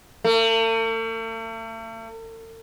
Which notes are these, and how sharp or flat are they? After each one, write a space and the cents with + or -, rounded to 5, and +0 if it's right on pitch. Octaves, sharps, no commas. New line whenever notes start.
A3 +45